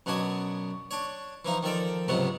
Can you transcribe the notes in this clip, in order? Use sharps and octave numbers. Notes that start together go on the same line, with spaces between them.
F#2 B2 D4 F#4 G#5 D#6
D4 C#5
E3 F3 D#4
D#3 F3 A4 D5
C#2 G#2 C3 F#3 B3